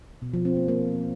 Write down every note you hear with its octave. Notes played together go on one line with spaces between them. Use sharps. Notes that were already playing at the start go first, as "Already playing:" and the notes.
B2
F3
C4
A#3
A#3